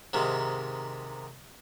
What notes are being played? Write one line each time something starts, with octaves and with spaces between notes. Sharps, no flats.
G#2 C3 D#3